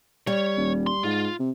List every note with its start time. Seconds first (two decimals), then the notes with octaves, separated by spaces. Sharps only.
0.27 G3 C#5
0.57 D#1
0.87 C6
1.04 G#2 F4
1.40 C3